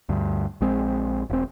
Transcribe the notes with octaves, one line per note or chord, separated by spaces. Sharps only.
D2 G2
A#1 G#3 C4
E1 C4